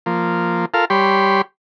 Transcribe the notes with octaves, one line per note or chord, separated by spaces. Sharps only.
F3 A#3
F4 A4 A#4 F5
G3 G4 C#5 B5 C6